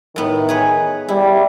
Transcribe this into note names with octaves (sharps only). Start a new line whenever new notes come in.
A2 D#3 B3
G#4 B4 C#5
G3 E4